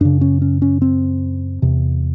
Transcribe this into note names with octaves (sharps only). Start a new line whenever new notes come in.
F#2 C#3 D4
C#4
C#4
C#4
C4
E2 C3